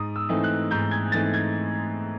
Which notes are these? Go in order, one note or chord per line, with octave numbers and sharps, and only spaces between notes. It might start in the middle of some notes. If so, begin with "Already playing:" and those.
Already playing: G#2 D#6
E6
E3 A3 C4 D#4
F#6
G#2 G6
G#6
E3 A3 C4 D#4 A6
G#6